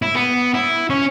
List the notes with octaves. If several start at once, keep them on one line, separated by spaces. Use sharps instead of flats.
E4
B3
E4
C#4